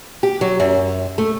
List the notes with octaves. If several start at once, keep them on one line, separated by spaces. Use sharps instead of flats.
G4
F#3
F#2
A3